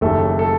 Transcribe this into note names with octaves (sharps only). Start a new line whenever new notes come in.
F#1 F#2 D#3 G3 A3 A4
A4